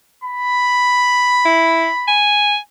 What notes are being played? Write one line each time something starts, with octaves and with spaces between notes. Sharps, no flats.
B5
E4
G#5